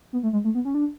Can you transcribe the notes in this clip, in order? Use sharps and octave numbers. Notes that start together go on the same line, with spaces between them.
B3
A3
G#3
A3
B3
C#4
D4